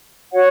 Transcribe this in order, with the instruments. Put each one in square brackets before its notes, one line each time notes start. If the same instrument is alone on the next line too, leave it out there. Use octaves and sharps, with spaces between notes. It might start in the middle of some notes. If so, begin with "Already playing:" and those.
[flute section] F#4 C#5 F#5